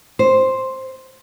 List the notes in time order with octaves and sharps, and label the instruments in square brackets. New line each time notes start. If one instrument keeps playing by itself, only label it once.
[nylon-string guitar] C5